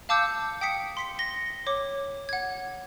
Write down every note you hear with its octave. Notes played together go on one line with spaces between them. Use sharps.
F5 A5 D6 E6 G6 C#7
G5 D#6 B6 C#7
C6 B6 C#7
A#6 G7
C#5 D6
F#5 G#6